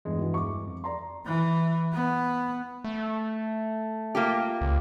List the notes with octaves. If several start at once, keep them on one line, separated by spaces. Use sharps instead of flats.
E2 G2 G#3
E3 F#4
C#6 D6
F2
D5 A#5 C6
E3
B3
A3
A#3 F4 G4
C#2